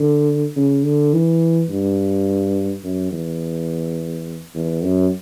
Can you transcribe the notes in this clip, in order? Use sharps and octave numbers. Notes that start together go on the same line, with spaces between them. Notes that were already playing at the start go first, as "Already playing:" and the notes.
Already playing: D3
C#3
D3
E3
G2
F#2
E2
E2
F#2